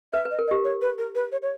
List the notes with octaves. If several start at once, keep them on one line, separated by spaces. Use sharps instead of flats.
B4 E5
B4
D#5
A#4
D#5
G4
C#5
B4
A#4
B4
C#5
C#5